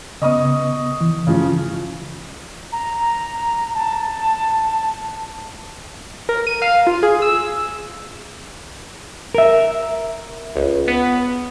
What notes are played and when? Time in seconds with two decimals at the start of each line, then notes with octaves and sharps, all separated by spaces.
0.22 C#3 B3 D#5 C#6 D#6
1.01 E3
1.27 C#3 F3
2.72 A#5
3.74 A5
6.29 A#4
6.47 D#7
6.62 F5
6.87 F4
7.03 G#4
7.22 E6
9.35 A#4 E5
10.56 C#2
10.88 B3